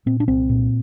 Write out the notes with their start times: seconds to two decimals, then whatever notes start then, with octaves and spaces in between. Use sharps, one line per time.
0.06 A#2 C4
0.20 D4
0.28 C2 C4
0.49 A#2